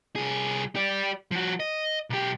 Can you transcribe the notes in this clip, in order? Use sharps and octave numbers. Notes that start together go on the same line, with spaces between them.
C2 G#4
G4 D5
F3 F#4
D#5
B1 G4